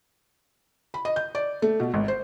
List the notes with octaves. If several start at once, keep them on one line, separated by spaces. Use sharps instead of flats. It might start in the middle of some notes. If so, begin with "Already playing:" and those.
B5
D#5
G6
D5
A3
B2
G#1
C5